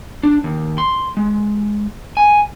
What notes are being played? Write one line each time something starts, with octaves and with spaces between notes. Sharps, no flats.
D4
D#2
C6
G#3
G#5